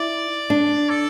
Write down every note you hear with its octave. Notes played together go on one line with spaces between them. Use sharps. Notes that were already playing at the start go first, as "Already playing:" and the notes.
Already playing: E4 D5
D4
A4